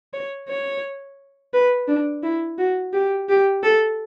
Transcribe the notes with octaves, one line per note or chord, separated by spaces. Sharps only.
C#5
C#5
B4
D4
E4
F#4
G4
G4
A4